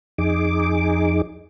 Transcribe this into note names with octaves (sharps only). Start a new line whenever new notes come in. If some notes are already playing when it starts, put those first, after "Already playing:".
F2 D#4 G#4 D6